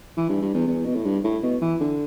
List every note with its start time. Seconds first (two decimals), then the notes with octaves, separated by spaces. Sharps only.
0.17 E3
0.29 G2
0.41 G2
0.55 E2
0.67 E2
0.85 B2
0.95 A2
1.05 G2
1.24 A2
1.43 B2
1.61 E3
1.80 D3